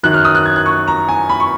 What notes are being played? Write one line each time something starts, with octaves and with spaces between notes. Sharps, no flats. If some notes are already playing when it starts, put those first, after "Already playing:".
F#2 D#3 F#3 F#6
F6
D#6
F#6
G#6
F#6
C#6
A#5
G#5
B5
C#6